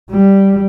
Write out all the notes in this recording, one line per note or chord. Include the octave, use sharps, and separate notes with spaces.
G3